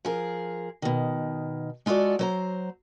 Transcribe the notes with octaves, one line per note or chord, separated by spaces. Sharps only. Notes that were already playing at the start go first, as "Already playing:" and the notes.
F3 G#4 A#4
B2 D#3
G#3 F4 F#4 A4 D5
F#3 C5 A#5